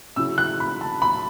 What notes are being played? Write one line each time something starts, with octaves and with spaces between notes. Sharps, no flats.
C#3 F#3 C#4 E4 E6
F#6
B5
A5
B5